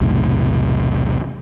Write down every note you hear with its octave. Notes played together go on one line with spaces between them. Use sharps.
B1 E2 A2 C3